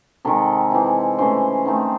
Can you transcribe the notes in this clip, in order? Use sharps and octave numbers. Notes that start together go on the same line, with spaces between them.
C3 D#3 G#3 A4
E3 C4 E4
C#3 E3 A3 C5
D#3 A3 C4 D#4